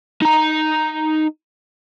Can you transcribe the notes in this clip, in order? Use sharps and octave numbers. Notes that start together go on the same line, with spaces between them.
D#4 A#5